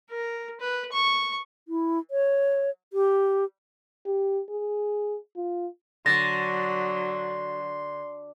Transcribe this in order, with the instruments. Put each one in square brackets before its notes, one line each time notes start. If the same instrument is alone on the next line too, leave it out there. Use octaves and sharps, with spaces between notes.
[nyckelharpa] A#4
B4
C#6
[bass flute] E4
C#5
G4
[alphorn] G4
G#4
F4
[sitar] D3 [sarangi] F#3 [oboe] C6 [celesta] A6 A#6